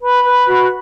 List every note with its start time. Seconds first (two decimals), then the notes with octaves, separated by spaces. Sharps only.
0.01 B4 B5
0.25 B4
0.47 F#4